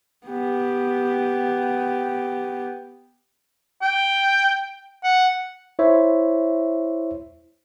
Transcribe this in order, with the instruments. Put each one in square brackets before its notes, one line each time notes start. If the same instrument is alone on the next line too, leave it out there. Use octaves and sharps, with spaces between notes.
[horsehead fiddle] B3 G4
[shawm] G5
F#5
[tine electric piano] E4 C5 C#5 E5